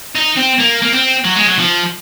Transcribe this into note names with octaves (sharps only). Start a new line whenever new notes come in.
D#4
C4
A#3
A#3
C4
F#3
G#3
F#3
F3